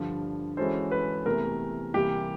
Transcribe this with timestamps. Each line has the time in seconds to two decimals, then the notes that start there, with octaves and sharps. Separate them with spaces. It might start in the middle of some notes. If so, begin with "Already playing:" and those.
Already playing: G2 D3 F3
0.57 E3 G#3 C#4 F#4 A4 C5
0.91 B4
1.26 E2 C3 E3 A3 A#4
1.94 C3 E3 G3 A#3 G4